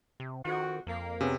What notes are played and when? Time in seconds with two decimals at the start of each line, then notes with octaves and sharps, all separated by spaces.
0.20 C3
0.45 F2 D#3 F#4
0.87 F2 A#3
1.21 C3 B3 C#4 G#4